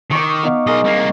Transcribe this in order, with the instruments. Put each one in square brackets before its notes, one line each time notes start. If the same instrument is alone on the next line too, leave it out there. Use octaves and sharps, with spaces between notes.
[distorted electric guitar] D#3 [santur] C#6 D6
[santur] B3 D#4 F5
[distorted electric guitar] B1 D#5 [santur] G#3 A#4
[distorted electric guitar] C2 A#3